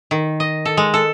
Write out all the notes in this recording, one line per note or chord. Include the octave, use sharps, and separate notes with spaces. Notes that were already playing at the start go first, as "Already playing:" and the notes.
D#3
D#5
A4
G#3
A4